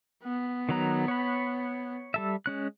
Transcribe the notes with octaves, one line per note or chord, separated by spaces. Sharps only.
B3
D#3 F#3 A#5
C#5 B5
G3 A4 E5
G#3 C#4 F#6